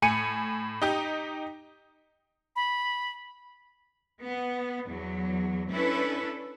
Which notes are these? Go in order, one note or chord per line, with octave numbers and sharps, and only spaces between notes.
A2 G#5 C#7 D#7
D#4 G4
B5
B3
E2 F#3
C#4 D4 E4 A4 B4